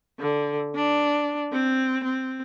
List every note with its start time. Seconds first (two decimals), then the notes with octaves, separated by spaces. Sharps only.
0.19 D3
0.75 D4
1.52 C4
2.04 C4